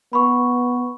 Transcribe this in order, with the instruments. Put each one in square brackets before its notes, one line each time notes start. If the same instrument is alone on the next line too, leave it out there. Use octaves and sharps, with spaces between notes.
[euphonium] B3 [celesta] B5 C#6